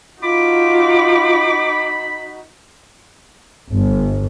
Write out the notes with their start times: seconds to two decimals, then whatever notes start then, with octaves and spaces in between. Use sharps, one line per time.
0.23 D#4 F4 F#4 B5 D6
3.71 G1